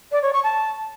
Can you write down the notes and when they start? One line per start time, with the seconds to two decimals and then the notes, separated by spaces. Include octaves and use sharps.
0.12 D5
0.22 C#5
0.33 C#6
0.44 A5